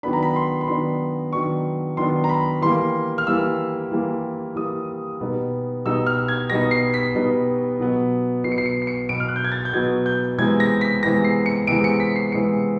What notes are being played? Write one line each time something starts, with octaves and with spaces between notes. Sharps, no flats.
D#3 F#3 B3 D4 B5
A#5
B5
C6
B5
D#3 F#3 B3 D4 C6
D#3 F#3 B3 D4 C#6
D#3 F#3 B3 D4 C6
A#5
B5
E3 G3 A#3 C6
F6
E3 G3 A#3 E6
E3 G3 A#3
E3 G3 A#3 D#6
B2 G3 B3 D#4
B2 G3 B3 D#4 E6
F6
G#6
B2 G3 B3 D#4 A#6
C7
B6
B2 G3 B3 D#4
B2 F#3 B3
B2 F#3 B3 C7
C#7
C7
C#7
C7
C#7
B2 F#3 B3 D7
F6
F#6
G6
G#6
A6
G6
B2 F#3 B3 G#6
G6
C3 E3 G#3 B3 G#6
A#6
B6
C3 E3 G#3 B3 A#6
C7
C#7
C3 E3 G#3 B3 D7
C#7
B6
C7
C3 E3 G#3 B3 C#7